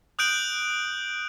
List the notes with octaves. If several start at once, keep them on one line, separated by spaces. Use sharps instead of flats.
D#6 F#6 G6 D7 F#7